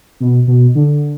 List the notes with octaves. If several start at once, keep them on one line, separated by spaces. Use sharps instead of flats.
B2
B2
D3